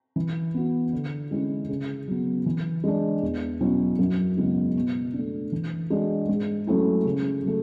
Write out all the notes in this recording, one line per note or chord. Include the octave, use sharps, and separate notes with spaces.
E3
B3 F#4
D3
G#3 C#4 E4
C#3
F#3 B3
E3
G#3 D4
E2
B2 F#3 C#4 E4
F#2
C#3 G#3 B3 E4
B2
A3 D4
E3
G#3 D4 F#4
G#2
F#3 A3 C#4 E4
C#3
F#3 A3